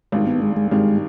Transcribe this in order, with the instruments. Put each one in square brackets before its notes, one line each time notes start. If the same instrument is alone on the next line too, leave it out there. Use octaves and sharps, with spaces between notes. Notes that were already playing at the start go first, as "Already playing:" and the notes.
[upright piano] G#1 G2 D#3 [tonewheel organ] G#3
[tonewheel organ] B3
G#3
G#3
[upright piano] G#1 G2 D#3 [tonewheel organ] G#3